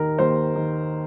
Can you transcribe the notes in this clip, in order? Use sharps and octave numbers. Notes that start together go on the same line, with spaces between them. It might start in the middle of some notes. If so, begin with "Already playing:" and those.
Already playing: D#2 D#3 A#4
D#2 C5
D#3